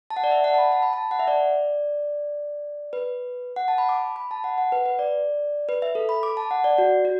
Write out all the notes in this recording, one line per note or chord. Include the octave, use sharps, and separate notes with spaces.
A5
F#5
D5
E5
F#5
A5
B5
A5
B5
A5
F#5
E5
D5
B4
F#5
A5
B5
D6
B5
A5
F#5
F#5
B4
B4
D5
B4
E5
A4
B5
D6
A5
F#5
D5
F#4
F#4